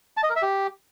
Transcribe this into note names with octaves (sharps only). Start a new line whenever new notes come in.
A5
D#5
A#4
E5
G4